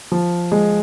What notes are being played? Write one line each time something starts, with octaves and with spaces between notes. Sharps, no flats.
F3
G#3